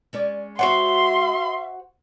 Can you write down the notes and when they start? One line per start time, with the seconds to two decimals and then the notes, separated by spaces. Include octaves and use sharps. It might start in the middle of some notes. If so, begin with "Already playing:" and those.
0.13 G#3 C#4 D5
0.59 F#4 C5 E5 F#5 C6